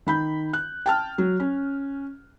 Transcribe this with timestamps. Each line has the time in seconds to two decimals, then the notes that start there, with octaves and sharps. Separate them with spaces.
0.06 D#3 B5 G6
0.53 F#6
0.86 G5 A5 F6
1.18 F#3
1.40 C#4